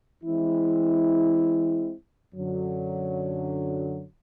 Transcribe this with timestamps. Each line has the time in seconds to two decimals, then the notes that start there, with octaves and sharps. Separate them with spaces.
0.24 E3 G#3 C4 E4
2.35 F#2 D3 F#3